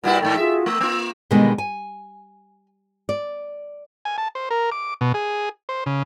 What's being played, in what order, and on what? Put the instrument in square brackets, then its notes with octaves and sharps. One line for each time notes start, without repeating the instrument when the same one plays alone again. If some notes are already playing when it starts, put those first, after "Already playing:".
[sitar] A#2 G3 E4 [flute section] F#4 B4 F#5
[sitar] G#2 D#3 A3 [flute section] D5 G5
[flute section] F4 F#4 G#4 [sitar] E5
[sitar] A3 [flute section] E6
[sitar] A#3 F4
[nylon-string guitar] B2 D3 D#3 G3 G#3 B3
G#5
D5
[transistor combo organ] G#5
A5
C5
A#4
D6
B2
G#4
C5
C#3